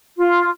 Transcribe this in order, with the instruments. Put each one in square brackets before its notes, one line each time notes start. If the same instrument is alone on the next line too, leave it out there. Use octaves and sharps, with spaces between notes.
[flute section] F4